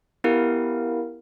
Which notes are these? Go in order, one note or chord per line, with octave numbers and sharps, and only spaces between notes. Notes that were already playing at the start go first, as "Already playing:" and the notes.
B3 E4 G4 A#4 F5